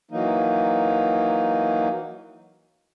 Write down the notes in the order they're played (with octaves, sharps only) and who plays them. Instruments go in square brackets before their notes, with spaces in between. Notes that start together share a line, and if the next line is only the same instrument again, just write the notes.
[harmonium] E3 F#3 A#3 D#4